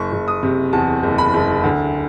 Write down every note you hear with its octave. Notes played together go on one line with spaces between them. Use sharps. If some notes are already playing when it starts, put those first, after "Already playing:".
Already playing: F#1 C#6
F#1
D#6
C3
E2 A5
F#1
B5
F#1
D2